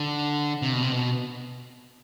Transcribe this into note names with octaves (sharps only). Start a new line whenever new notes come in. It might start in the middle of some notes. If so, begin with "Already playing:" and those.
Already playing: D3
C3
B2
C3
B2